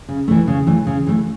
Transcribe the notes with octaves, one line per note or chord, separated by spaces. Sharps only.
C#3
E3 A3
C#3
E3 A3
C#3
E3 A3